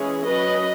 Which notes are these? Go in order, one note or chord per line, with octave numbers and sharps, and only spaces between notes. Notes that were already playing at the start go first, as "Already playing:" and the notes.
Already playing: E3 G#3 C#4 G#4
F#3 C#4 B4 D#5